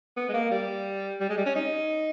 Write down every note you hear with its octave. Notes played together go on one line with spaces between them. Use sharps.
B3
G#3
A#3
G3
G3
G#3
G3
C#4
D#4